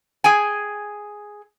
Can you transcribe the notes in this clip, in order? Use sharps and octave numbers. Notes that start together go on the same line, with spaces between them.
G#4 G5 G#5